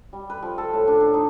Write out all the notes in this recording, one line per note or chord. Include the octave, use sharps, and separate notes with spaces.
G3
B4
F3
A4
A2
D4
D4
D#4